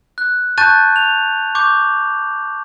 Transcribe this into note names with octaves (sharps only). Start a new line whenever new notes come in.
F#6
A5 C#6 F#6 G6 A6 D#7
F7
C#6 D6 G6